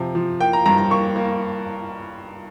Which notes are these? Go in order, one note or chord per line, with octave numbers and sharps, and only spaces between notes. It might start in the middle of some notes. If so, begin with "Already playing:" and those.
Already playing: C3 F3
F3
A#3 G5
A#5
G2 A#5
A#5
A#3 C#6
A#3